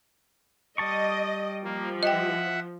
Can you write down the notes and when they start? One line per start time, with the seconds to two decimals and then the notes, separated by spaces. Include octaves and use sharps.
0.78 G3 D#5 A5 C#6
1.64 F3 A#3
2.03 D#5 E5 F#5 G5